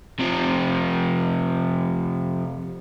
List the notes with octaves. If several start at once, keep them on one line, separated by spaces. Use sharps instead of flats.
C3 F3